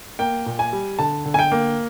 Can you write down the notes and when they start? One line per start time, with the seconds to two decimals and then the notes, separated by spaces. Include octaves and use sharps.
0.19 A#3 G5
0.46 A#2
0.59 G#5
0.73 G3
0.99 D3 A5
1.25 D3
1.34 G#5
1.39 G5
1.52 A#3